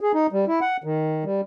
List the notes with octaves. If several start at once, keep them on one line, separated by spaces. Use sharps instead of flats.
G#4
D#4
G3
E4
F#5
D#3
G3